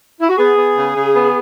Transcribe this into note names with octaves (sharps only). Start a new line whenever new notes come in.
E4
F#4
B3 G#4
B3
C#3
C#3
B3